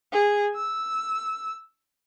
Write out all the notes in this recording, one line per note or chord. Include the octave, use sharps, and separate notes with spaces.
G#4
E6